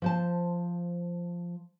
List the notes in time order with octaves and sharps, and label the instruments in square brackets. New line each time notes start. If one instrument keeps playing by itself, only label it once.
[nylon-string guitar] F3 C5 A5